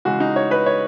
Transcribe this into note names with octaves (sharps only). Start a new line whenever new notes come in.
C#3 E3 G#3 F#4
D#4
C#5
B4
C#5